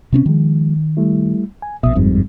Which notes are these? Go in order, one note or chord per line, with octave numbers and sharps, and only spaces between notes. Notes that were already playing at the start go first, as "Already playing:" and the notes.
C3 C4 C#4
D#3 F3 G#3
G3 A3 E4
G#5
A#1 B2 E5 D#6
G1 F2 G#2 G3 C4